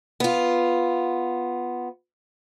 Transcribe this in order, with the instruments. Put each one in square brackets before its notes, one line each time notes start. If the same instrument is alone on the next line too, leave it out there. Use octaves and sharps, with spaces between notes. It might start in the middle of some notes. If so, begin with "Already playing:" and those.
[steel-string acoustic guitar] B3 F4